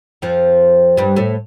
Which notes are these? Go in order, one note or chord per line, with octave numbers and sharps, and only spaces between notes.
F2 F3
G2 G3
A2 A3